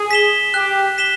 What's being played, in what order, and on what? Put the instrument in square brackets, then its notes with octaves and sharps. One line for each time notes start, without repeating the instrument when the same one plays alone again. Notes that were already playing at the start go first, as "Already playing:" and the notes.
Already playing: [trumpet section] G#4
[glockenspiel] B6 E7 G7
[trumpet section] G4 [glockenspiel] F#6
[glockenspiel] B6 E7 G7